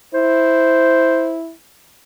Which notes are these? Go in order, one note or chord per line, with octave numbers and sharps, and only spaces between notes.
E4 C5